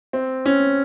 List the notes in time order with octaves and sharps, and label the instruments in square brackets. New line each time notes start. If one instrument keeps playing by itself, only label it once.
[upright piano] C4
C#4